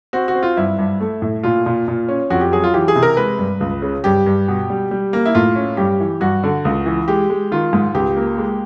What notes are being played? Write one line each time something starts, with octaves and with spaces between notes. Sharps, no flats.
C4 F#4
F#4
C4
F4
G2 E4
G2
A3
A2
A#2 F4
A#2
A#2
C#4
F2 F#4
G4
F#3 G#4
F4
E3 G4
G#4
C3
A#4
G#3 B4
G2
C#2
C#3
G2 G4
G2
B2
G3
G3
A#3
E4
A2 F4
C#4
G2 G4
E3
G2 F#4
D3
C#2
E3
G#3 G4
G#3
D#3 F4
G#2
C#2 G4
A#3
G#3